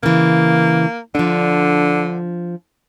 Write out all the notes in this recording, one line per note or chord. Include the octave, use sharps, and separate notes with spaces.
C#3 E3 A#3
D3 F3 D4